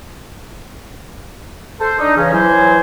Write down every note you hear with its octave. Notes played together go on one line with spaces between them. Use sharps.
A4 C5
D4 D#4
C#3 E3 C#4
E3 F#3 C5 G#5